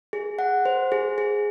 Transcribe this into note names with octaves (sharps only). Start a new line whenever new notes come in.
G#4
F#5
C5
G#4
G#4